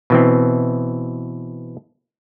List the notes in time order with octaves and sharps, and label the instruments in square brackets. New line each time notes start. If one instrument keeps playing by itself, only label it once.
[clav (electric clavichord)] B2 E3 C4